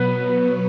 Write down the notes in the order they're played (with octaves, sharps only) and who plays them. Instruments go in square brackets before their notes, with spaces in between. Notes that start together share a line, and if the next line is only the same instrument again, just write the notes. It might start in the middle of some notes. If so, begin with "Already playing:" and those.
Already playing: [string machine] B2 F#3 B3 [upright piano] B4